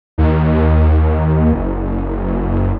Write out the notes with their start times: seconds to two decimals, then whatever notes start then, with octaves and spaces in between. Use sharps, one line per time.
0.18 D#2
1.53 F#1